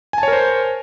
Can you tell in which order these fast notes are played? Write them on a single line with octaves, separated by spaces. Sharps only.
G#5 A5 C#5 A#4 C5